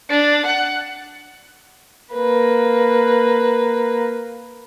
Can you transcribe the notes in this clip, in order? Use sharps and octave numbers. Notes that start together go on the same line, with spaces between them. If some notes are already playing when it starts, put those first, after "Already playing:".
D4
F#5
A#3 B4